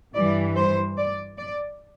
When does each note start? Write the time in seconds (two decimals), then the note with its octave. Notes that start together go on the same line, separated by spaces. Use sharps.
0.15 G2 E3 G3 D5
0.56 C5
0.97 D5
1.38 D5